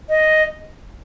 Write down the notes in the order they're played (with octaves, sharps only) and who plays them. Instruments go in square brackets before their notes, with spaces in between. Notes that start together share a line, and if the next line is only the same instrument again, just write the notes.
[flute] D#5